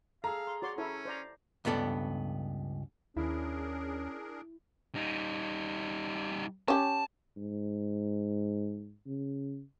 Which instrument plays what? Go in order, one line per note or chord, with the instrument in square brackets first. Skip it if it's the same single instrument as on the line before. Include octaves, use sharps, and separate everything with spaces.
[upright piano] G#4 A#5 [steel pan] A4 [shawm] F5
[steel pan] C6
[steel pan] F#4 C#5 C6 [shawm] D5
[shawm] C#4 [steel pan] E4 A4 C#5
[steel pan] C5 D5 A#5
[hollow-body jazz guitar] C#2 G2 B3 A4 D5
[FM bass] D#2 [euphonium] C#4 [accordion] D4 G#4 A#4 [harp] E4
[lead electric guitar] G3 D#4
[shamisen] C#4 G4 [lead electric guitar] A5
[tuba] G#2
C#3